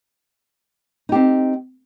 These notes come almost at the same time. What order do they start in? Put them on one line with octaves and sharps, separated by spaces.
D#4 G4 C4